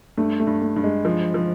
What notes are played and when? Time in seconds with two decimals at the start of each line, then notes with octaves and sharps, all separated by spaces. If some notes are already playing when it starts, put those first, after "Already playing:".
0.17 G2 A3
0.40 A3
0.47 G2
0.62 A3
0.76 G2
0.84 G#3
1.05 F3
1.34 F3